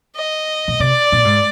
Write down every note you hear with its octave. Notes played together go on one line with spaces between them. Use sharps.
D#5
A#2
C3 D5
A#2
G#2